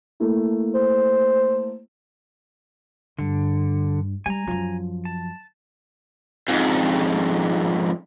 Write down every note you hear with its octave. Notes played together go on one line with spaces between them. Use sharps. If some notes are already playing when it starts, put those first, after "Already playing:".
A3 A#3 E4
C5
G2 D3
G3 G#5 A#5
F#2 F3
A5
F2 G#2